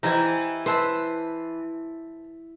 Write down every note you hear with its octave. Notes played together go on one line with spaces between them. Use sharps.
E3 G4 C5 D#5 G#5 A#5
B4 C5 E5 A5 B5